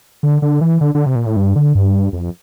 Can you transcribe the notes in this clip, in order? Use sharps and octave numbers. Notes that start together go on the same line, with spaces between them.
D3
D3
E3
D3
D3
C3
A#2
A2
G2
D3
G2
F2